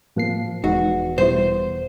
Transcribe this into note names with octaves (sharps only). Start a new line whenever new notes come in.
A2 F3 A#3 C7
E1 E2 G#3 D#4 F#4
B2 G3 E4 C5